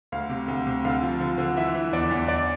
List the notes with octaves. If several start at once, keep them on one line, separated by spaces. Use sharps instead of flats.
D2 F5
C3
D2
C3
D3 F5
F3
D3
D3
E3 E5
E3
E2 D5
E2
E2 D5